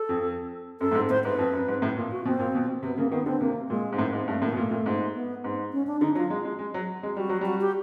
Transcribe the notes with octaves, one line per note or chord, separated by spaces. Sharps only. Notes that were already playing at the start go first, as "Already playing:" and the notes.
Already playing: A4
F2
F#2 A4
A2
G#2
A2 C5
G#2 B4
F2
F#2
G#2
A2
A#2
F#4
B2 C4
A#2
B2
C3 B3
C#3 A#3
D#3 B3
D3 C4
C3 A#3
A#2 G#3
G#2
A2 A#3
G#2
G2 A3
A2 A#3
B2
A#2 A3
A#2
G#2
B3
G#2
C#4
D4
D3 D#4
F#3 F4
G#3
G#3
G#3
F#3
G#3
G3 F#4
F#3
G3 F#4
G4